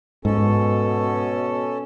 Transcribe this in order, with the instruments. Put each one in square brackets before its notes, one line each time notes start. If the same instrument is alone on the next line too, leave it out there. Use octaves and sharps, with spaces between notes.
[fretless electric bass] G#2 [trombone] B2 [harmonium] C#4 A4